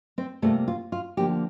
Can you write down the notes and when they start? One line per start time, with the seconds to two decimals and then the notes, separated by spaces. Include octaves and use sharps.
0.18 C4 C5
0.42 C3 G3 A3 A#3 F4 A4
0.68 F4
0.92 F4
1.17 D3 F3 A#3 G4